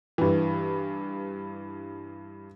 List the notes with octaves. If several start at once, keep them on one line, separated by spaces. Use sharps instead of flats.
G2 E3